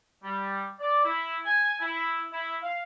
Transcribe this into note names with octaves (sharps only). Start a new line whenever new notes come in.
G3
D5
E4
G#5
E4
E4
F5